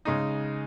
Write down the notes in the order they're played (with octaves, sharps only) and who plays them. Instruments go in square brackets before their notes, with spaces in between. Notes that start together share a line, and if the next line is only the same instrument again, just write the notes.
[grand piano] C#3 G#3 D#4